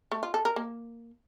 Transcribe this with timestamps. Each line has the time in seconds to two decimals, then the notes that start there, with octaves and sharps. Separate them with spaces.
0.11 A3
0.23 F4
0.34 A4
0.45 A#4
0.56 A#3